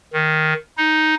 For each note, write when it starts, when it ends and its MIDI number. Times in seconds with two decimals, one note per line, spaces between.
0.13 0.54 51
0.77 1.15 63